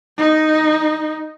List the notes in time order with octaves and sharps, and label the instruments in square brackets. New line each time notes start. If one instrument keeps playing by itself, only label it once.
[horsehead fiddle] D#4